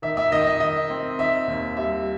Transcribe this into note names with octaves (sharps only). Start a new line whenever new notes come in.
D#3 E5
E5
D#3 D#5
D#5
D#3 D#5
C4
D#3 E5
D#2
G3 E5